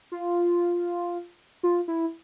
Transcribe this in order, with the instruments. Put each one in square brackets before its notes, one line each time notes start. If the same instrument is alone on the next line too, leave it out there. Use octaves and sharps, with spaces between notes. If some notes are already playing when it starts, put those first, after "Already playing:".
[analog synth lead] F4
F4
E4